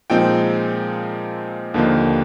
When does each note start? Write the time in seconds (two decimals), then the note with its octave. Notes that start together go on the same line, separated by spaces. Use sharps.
0.10 A#2 F3 G#3 C4 D#4 G5
1.74 D#2 D3 F3 A#3 D#4